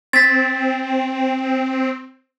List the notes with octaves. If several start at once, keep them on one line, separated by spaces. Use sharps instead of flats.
C4 A6 B6